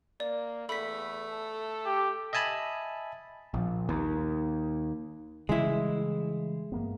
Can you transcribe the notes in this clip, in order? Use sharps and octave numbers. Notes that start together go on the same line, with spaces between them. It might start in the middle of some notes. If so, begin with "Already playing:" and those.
A#3 D5
E2 A3 B5 B6
A4
G4
D#5 E5 G#5 A5 B5
A#1
D#2
C#3 E3 G3 G#3 E4
G2 A#3 B3